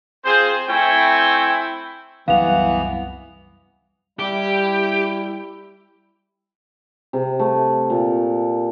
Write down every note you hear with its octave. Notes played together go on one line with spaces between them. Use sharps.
C4 F4 G#4 C5
A3 C4 E4 G5 G#5 C#6
C2 F#2 E3 B3 F5 F7
G3 E4 G4
C3
A3
A#2